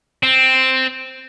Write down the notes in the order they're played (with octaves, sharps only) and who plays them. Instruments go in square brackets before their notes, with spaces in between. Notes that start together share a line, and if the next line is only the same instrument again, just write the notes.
[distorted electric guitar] C4